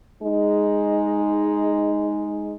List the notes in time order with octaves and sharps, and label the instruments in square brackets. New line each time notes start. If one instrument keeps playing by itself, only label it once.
[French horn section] G#3 D#4